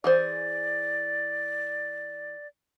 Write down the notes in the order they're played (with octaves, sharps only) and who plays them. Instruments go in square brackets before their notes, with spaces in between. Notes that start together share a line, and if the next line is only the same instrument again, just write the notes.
[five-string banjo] E3 G#4 C5 [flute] D5